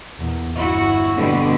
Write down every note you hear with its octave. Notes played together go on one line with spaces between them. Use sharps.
E2 A#2
G1 E4 F#4
B2 D3 G3